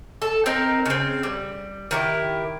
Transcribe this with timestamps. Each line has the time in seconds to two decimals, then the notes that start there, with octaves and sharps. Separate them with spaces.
0.22 A4
0.46 C4 D#4 A#4
0.86 C#3 C4
1.23 G3
1.91 D#3 E4 G4